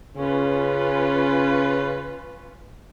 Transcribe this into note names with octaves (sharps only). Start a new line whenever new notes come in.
C#3 C#4 F4 B4